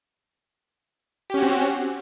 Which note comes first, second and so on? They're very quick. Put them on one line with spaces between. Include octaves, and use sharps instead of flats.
G4 C#4 F#4 C4